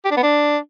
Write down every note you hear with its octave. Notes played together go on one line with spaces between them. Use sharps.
G4
D4
B3
D4